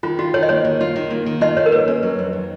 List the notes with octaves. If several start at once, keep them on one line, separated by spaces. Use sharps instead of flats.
D#3 F4
F4 F#4
D#3 C#5
D#5
A#3 C#5
D#3
F4
D#3
A#3
D#3
F4 D#5
D#3 C#5
A#4
A#3 B4
C#4
F#3
F2
D#3